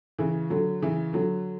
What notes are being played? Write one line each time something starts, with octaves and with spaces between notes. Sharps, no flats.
C#3 E3
D3 F#3
C#3 E3
D3 F#3